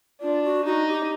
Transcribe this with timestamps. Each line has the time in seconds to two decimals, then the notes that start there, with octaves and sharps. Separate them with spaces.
0.22 D4 F4
0.44 F#4
0.65 D#4 F#4
0.88 G4